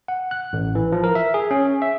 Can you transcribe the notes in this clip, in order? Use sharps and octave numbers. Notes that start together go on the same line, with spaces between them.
F#5
F#6
A1
E3
F3
A#4
E5
G#4
C#4
E5